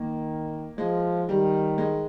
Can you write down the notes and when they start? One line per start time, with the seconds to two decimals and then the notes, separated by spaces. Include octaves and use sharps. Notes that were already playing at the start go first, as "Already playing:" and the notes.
Already playing: D#3 A#3
0.78 F3 G#3
1.28 D#3 G3
1.78 G#3